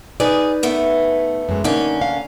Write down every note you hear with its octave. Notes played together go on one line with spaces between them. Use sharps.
D#4 G#4 B4 D5
A3 B3
F#2 G#3
D3 A#3 C#4 D#4
F5